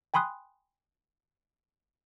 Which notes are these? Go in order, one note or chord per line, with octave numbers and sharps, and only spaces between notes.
G5 G#5 B5 C6 D#6 F#6